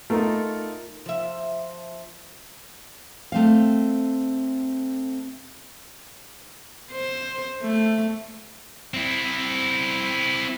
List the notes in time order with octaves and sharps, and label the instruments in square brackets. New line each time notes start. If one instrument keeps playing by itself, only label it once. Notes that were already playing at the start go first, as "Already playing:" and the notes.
[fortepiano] A3 [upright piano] D#4 F4 A#4
[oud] F3 E5
[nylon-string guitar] A3 C4 F5
[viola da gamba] C5
A3
[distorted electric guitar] C4 E4